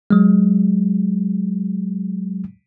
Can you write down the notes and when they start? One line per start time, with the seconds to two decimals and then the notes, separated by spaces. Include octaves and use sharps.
0.11 F#3 G#3